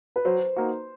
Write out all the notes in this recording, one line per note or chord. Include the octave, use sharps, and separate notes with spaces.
B4
F#3 C5
A#3 D#4 F#4